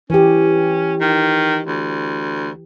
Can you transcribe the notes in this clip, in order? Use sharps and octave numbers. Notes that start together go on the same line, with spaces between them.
E3 C#4 G4
D#3
D2